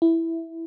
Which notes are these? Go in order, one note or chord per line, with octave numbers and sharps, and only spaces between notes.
E4